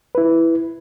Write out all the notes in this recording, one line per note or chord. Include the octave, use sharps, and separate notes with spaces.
E4 B4